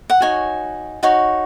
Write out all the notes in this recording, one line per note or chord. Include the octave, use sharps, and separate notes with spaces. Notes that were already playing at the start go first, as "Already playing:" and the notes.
F#5
D#4 F#4 C#5 G#5
D#4 F#4 C#5